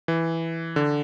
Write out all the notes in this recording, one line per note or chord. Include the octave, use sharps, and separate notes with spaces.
E3
D3